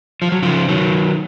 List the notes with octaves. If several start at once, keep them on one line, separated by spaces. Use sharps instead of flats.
F3
F#3
C#3 F3
D#3 F#3